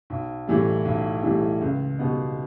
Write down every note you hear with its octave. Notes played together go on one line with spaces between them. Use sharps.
B1
A2 E3 G3
B1
A2 E3 G3
C#2
B2 G3 B3 D#4